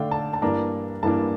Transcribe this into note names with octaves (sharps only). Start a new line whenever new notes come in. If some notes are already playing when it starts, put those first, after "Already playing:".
Already playing: D3 A3 D4 F5 G5
A5
A5
G2 E3 A#3 D4 A#5
G2 E3 A#3 D4 A5